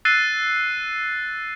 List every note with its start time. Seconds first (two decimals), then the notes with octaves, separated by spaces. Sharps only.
0.05 E6 F#6 A6 C7 D#7